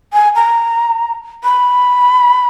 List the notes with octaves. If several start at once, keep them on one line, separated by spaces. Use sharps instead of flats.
G#5
A#5
B5